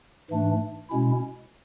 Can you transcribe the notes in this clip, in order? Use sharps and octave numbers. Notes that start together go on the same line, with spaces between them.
G#2 E3 A3 D4
B2 G#3 C#4 E4